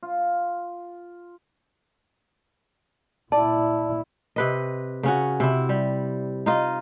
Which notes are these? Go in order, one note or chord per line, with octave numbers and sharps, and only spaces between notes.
F4
A#2 E4 D5 A5
C3 B4 D#5
C#3 C#4 F#4
C3 E4
G3
D#4 F4 D#5